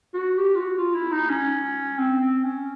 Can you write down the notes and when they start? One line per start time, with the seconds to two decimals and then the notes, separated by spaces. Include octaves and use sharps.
0.14 F#4
0.37 G4
0.55 F4
0.60 F#4
0.78 F4
0.95 E4
1.12 D#4
1.30 C#4
1.98 C4
2.21 C4
2.44 C#4